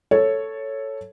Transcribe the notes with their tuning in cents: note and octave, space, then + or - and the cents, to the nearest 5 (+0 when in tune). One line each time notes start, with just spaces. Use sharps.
A4 +0 C#5 +0